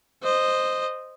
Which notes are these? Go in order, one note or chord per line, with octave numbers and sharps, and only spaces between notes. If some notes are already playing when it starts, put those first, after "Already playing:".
C5 D#5